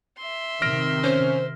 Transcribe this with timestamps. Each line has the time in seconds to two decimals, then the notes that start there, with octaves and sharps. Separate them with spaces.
0.19 E5 C6
0.62 C3 D#3 F6 A#6 D7
1.04 C#4 C5